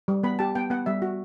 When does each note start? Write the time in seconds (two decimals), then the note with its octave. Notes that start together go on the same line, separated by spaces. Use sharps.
0.08 G3
0.23 B3 B5
0.39 G4 A5
0.55 B3 G5
0.70 B3 F#5
0.86 G3 E5
1.02 F#4